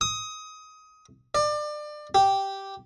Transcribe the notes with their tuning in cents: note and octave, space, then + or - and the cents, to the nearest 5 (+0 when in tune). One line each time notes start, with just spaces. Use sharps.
D#6 +20
D5 +30
G4 -5